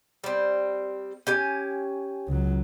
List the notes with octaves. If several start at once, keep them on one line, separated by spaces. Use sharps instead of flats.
G3 C4
C#4 G4 G#5
C#2 F#3